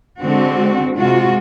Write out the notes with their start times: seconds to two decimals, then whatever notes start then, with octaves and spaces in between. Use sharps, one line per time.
0.20 D3 G#3 C4 F#4
0.95 C3 G#3 F4 F#4